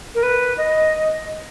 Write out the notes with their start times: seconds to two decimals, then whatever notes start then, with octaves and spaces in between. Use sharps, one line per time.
0.15 A#4
0.23 B4
0.58 D#5